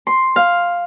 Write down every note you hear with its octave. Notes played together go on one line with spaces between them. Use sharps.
C6
F5